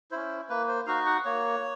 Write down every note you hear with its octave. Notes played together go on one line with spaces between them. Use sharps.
C#4 E4 C5
A#3 B4
C5
D#4 F#4 F5
F#5
A#3 C#5